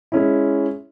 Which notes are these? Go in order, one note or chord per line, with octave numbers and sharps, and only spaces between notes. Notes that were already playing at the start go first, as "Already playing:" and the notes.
G#3 C#4 E4